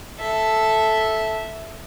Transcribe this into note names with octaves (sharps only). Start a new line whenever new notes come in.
A4 E5